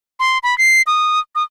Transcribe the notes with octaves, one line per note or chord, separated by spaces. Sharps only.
C6
B5
C7
D#6
D#6